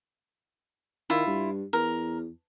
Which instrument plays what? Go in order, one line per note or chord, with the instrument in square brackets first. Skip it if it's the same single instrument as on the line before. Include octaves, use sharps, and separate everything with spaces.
[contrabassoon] D#3 [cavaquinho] E4 F4
[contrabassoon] G2
[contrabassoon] E2 [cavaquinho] A#4